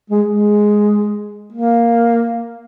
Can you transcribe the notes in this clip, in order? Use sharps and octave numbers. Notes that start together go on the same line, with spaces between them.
G#3
G#3
A#3